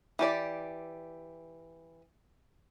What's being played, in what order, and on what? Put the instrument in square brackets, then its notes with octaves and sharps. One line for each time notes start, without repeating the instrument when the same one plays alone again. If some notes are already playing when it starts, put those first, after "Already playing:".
[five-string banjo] E3 G4 D5